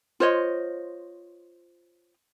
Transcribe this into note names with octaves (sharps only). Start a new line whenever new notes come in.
F4 C5 C#5 D#5